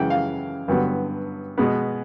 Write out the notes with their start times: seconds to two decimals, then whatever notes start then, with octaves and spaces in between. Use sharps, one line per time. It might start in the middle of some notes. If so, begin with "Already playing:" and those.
Already playing: F#2 C#3 E3 G#3 F#5 G5
0.10 F5
0.68 G2 D3 F#3 B3
1.58 B2 G#3 B3